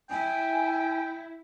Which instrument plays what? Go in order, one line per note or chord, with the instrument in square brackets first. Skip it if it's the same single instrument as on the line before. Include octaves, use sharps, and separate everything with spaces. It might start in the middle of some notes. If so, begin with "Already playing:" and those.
[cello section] E4 [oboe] G5 [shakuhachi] G#5